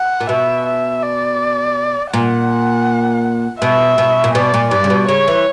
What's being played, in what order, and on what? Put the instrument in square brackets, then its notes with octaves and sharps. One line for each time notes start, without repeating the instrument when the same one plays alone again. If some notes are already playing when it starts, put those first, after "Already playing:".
Already playing: [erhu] F#5
[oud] A#2
[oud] B2 [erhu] E5
[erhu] E5
D5
[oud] A#2 [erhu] F#5
[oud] B2 [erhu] E5
[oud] B2
A#2
[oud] B2 [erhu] D5
[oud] A#2
[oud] G2 [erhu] D5
[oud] C#3
B2
[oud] C#3 [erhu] C#5
[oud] E3